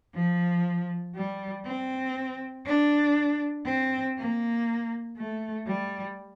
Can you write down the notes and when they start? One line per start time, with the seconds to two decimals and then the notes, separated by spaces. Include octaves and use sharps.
0.15 F3
1.15 G3
1.66 C4
2.66 D4
3.66 C4
4.18 A#3
5.17 A3
5.67 G3